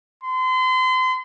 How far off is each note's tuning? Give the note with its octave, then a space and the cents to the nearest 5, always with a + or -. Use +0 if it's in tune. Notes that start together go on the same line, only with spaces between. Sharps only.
C6 -35